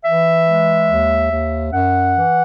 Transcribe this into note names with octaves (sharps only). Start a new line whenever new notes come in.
E3 E5
G#3
D#2
D#2
F#2 F#5
E3